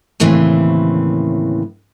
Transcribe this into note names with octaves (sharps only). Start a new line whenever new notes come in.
D#2 A2 C#3 E3 C4